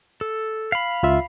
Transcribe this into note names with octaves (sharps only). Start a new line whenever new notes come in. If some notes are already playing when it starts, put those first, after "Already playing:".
A4
F5 B5
C#2 F4 E5